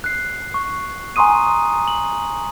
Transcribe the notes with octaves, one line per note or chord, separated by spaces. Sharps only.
F#6 C7
C#6
G#5 A#5 C6 C#6 D#6 D#7
F#7